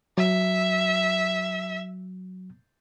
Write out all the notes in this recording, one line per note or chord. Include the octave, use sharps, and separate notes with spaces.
F#3 E5